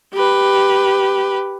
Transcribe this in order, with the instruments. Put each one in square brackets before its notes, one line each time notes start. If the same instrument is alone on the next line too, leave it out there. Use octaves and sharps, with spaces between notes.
[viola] G4 B4